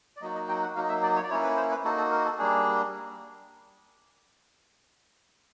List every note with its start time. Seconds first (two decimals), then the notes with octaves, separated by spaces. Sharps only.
0.17 D5
0.21 F#3 A#3 D#4 F#4 D#5
0.35 D#5
0.49 G5
0.62 F#5
0.76 F#3 A#3 D#4 F5
0.83 D#5
0.89 E5
1.03 D5
1.16 C#5
1.23 D5
1.30 A#3 C#4 E4 C#5
1.43 B4
1.57 C5
1.71 B4
1.84 A#3 D#4 F#4 A4
1.98 A4
2.11 A#4
2.25 A4
2.38 G3 A#3 D4 G#4